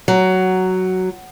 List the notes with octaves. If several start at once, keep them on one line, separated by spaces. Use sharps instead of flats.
F#3